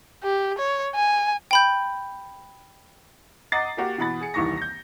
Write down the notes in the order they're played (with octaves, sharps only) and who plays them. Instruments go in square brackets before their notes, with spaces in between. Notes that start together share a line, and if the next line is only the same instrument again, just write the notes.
[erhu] G4
C#5
G#5
[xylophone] G5 B5 G6
[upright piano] D#5 F#5 A#5 D6 A6 C7
A#3 F#4 G4 A#4
B2 E3 F#5 B5 A6
G#4 C#7
D#1 C2 D#3 E3 C#6 A#6
G6 A#6